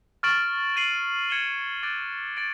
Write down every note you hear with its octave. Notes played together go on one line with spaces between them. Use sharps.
C#6 F6 A6 D7 F#7
A6 C7 D#7 F#7
G#6 C#7 E7 G7
D6 F#6 A6 D7
A6 D7 F#7